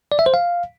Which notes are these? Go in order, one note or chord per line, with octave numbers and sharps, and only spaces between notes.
D5
E5
C5
F5